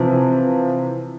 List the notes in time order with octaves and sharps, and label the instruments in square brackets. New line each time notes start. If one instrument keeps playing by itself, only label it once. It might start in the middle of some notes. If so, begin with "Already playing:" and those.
Already playing: [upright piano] C3 E3 F3